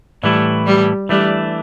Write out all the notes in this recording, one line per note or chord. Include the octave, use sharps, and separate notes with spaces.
A2 E3 G3 A3 E4
G3
E3 G3 A3 D4